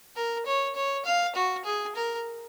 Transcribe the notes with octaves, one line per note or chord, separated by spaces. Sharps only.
A#4
C#5
C#5
F5
F#4
G#4
A#4